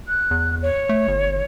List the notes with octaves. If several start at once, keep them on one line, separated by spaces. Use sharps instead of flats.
F#6
E2
C#5
A3
G1